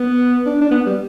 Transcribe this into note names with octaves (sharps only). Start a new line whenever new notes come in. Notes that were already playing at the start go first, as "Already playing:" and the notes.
Already playing: B3
D4
D4
B3
G3